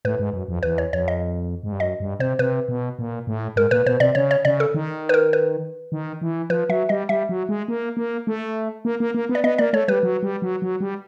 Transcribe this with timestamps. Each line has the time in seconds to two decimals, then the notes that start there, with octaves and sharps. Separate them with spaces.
0.05 A2 B4
0.19 G#2
0.33 F#2
0.48 F2
0.63 E2 B4
0.78 C#5
0.93 F2 C#5
1.08 D#5
1.63 G#2
1.72 G2
1.80 F#2 D#5
2.00 G2
2.20 C3 C5
2.39 C3 B4
2.69 B2
2.99 A#2
3.27 A2
3.56 G#2 A#4
3.71 A#2 B4
3.86 B2 C5
4.00 C3 D5
4.15 C#3 C#5
4.31 C#5
4.45 C#3 D5
4.60 A4
4.74 D#3
5.09 B4
5.14 A#4
5.33 B4
5.92 D#3
6.21 E3
6.50 F3 B4
6.69 F#3 E5
6.89 G3 D#5
7.09 G3 E5
7.29 F#3
7.49 G#3
7.68 A#3
7.97 A#3
8.27 A3
8.85 A#3
9.00 A#3
9.14 A#3
9.29 B3
9.35 D5
9.44 B3 D#5
9.58 A#3 D5
9.73 A3 C#5
9.88 G3 B4
10.03 F#3
10.23 G3
10.42 F#3
10.62 F#3
10.80 G3